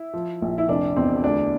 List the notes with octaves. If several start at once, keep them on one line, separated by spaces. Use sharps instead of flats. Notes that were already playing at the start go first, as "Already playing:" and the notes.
Already playing: E4
F3
A#1
E4
F1 D4
E2 C4
D2 D4